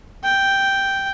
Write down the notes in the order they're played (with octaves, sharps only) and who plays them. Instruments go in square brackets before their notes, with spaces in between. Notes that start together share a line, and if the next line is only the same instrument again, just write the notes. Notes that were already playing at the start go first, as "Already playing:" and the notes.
[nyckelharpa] G5